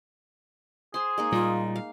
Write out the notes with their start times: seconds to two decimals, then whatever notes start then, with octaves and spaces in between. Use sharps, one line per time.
0.94 G#4 C5 C6
1.18 G#3 A#3 D#4
1.32 A#2 G3 F4
1.76 F5